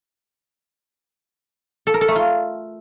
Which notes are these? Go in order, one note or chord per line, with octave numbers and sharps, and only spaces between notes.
A4
A#4
A4
A3
F4